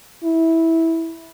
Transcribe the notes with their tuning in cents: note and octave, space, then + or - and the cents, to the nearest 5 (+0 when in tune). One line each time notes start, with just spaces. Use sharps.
E4 -10